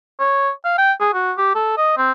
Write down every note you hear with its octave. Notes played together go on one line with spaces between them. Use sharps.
C#5
F5
G5
G#4
F#4
G4
A4
D#5
C4